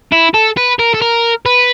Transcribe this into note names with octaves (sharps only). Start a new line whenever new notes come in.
E4
A4
B4
A#4
A4
A#4
B4